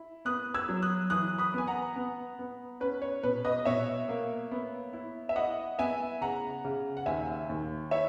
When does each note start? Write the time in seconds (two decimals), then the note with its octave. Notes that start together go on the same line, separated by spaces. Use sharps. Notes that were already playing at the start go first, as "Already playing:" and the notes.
Already playing: E4
0.25 B3 D#6 F#6
0.54 E6 G#6
0.69 F#3
0.82 D#6 F#6
1.10 E3 D#6 F#6
1.38 B5 D#6
1.54 B3 G#5
1.67 F#5 A#5
1.96 B3
2.39 B3
2.80 C#4 B4
3.02 C#5
3.23 B2 B4
3.44 B4 D#5
3.65 B2 C#5 E5
4.09 A#3
4.51 B3
4.93 E4
5.29 E5
5.36 E4 D#5 F#5
5.79 B3 E5 G#5
6.21 C#3 F#5 A#5
6.65 C#3
6.97 F#5
7.06 D#2 E5 G#5
7.49 D#2
7.91 E4 C#5 E5